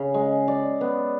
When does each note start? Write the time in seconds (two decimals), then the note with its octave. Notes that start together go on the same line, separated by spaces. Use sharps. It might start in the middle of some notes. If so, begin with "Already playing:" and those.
Already playing: C#3
0.14 G#3
0.48 D5
0.81 B3